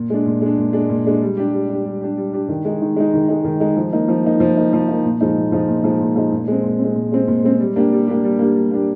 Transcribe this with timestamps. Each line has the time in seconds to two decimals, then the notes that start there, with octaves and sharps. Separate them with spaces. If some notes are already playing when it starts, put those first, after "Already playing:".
Already playing: A#2
0.10 G#3 D4
0.26 A#2
0.42 G#3 D4
0.57 A#2
0.73 G#3 D4
0.89 A#2
1.06 G#3 D4
1.22 G3
1.37 D4 G4
1.53 G3
1.69 D4 G4
1.85 G3
2.01 D4 G4
2.17 G3
2.33 D4 G4
2.49 D#3
2.65 G#3 D#4
2.82 D#3
2.96 G#3 D#4
3.14 D#3
3.29 G#3 D#4
3.44 D#3
3.60 G#3 D#4
3.77 F3
3.93 A#3 D#4
4.08 F3
4.24 A#3 D#4
4.40 F3
4.57 A#3 D#4
4.73 F3
4.88 A#3 D#4
5.05 A#2
5.21 F3 G#3 D#4
5.37 A#2
5.52 F3 G#3 D#4
5.68 A#2
5.84 F3 G#3 D#4
6.01 A#2
6.16 F3 G#3 D#4
6.32 A#2
6.48 G#3 C4
6.64 A#2
6.79 C4
6.84 G#3
6.96 A#2
7.12 G#3 C4
7.28 A#2
7.44 G#3 C4
7.60 G3
7.76 A#3 D4 G4
7.92 G3
8.07 A#3 D4 G4
8.24 G3
8.39 A#3 D4 G4
8.55 G3
8.71 A#3 D4 G4